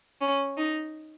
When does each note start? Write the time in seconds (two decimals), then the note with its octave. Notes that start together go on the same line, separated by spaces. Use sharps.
0.21 C#4
0.57 D#4